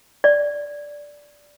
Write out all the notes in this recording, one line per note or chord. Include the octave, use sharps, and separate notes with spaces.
D5